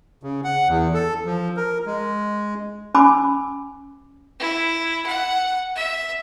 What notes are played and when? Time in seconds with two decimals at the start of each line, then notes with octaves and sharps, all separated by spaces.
0.23 C#3
0.44 F#5
0.68 E2
0.94 A4
1.26 F3
1.57 A#4
1.86 G#3
2.94 C#4 G#5 B5 D6 E6
4.40 E4
5.06 F#5
5.76 E5